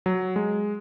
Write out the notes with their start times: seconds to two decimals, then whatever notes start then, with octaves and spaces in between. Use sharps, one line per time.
0.06 F#3
0.36 G#3